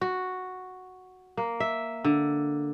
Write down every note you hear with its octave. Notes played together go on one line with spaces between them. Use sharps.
F#4
A#3
E5
D3